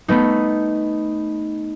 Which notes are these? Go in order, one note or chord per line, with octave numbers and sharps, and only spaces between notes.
A3 B3 D#4